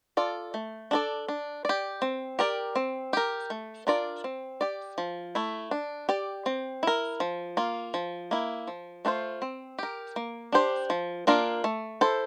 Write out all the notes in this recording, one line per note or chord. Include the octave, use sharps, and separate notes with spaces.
F4 A4 D5
A3
D4 A4 D5
D4
G4 D5
C4
G4 A#4 D5
C4
G4 A#4
A3
D4 F4 A#4 D5
C4
G4 D5
F3
A3 E4
D4
G4 D5
C4
E4 A#4
F3
A#3 F4
F3
A#3 E4
F3
A3 D4 F4 C5
C4
G4 A#4
A#3
D4 G4 C5
F3
A#3 D4 F4 A#4
A3
E4 A4 C5